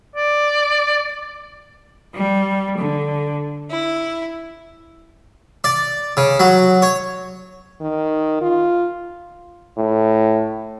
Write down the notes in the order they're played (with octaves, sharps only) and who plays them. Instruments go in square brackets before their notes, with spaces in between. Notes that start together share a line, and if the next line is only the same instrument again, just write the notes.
[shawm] D5
[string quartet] G3
D3
E4
[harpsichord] D5
C#3
F#3
C#5
[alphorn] D#3
F4
[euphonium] A2